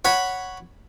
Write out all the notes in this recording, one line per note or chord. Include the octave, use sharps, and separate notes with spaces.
C#5 F#5 B5